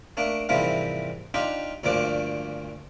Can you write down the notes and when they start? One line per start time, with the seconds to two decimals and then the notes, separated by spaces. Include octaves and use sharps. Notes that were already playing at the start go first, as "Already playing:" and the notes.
0.17 A3 A#3 D4
0.49 G#2 C3 E3 F3 G3 A#3
1.34 D4 D#4 F4 G4
1.84 D2 G2 A#2 F3 D4 D6